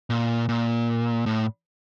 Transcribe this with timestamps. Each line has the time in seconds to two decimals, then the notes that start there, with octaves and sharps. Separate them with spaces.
0.10 A#2
0.49 A#2
1.26 A2